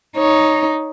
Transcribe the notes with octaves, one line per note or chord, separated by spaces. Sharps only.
D#4 C#5